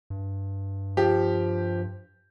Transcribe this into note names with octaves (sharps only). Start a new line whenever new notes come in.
G2
F3 G4